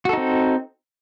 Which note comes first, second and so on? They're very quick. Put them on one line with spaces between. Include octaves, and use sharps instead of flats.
F#4 A4 D#4 C4